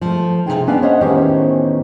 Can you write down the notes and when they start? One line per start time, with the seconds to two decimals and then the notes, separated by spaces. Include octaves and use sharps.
0.01 F3 A3
0.46 C3 E3 D#4 F4 G#4 G5
0.67 B3 C#4 D4 B4 F5
0.82 C5 C#5 D#5 E5 F#5
1.01 E2 A2 D#3 C#4 G4 C5